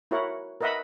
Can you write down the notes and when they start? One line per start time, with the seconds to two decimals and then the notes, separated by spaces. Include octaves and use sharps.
0.11 E4 F#4 A#4 C#5 F#5
0.61 A#4 B4 D#5 E5 F#5 B5